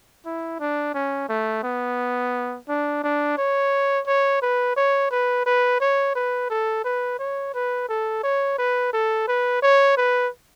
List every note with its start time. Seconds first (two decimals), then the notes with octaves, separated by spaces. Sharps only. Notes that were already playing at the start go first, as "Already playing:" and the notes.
0.26 E4
0.60 D4
0.94 C#4
1.29 A3
1.64 B3
2.69 D4
3.04 D4
3.38 C#5
4.07 C#5
4.42 B4
4.77 C#5
5.11 B4
5.46 B4
5.81 C#5
6.15 B4
6.50 A4
6.85 B4
7.19 C#5
7.54 B4
7.89 A4
8.24 C#5
8.58 B4
8.93 A4
9.28 B4
9.62 C#5
9.97 B4